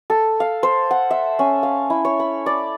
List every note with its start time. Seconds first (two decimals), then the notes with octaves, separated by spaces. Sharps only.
0.10 A4
0.40 F5
0.63 C5
0.91 F#5
1.11 E5
1.39 C#4
1.63 F5
1.90 E4
2.05 C#5
2.20 B5
2.46 D5